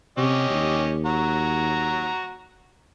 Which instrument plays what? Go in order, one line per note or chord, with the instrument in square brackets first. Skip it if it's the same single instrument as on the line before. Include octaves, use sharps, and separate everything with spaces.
[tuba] C3 [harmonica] C#4 G4 D#5
[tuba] D#2
[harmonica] F#4 A#5